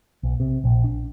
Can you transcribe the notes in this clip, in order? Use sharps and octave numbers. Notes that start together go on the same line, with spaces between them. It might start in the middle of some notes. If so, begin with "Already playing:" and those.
B1
C3
A#1
D4